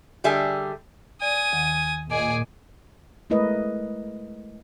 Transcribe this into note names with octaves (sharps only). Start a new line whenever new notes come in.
D3 G3 G#4 E5 G#5
D5 G#5 D#6
D#2 D#3 F#5
A#2 G#4 D#5 G#5 D6
G#3 A3 E4 A#4 B4 D#5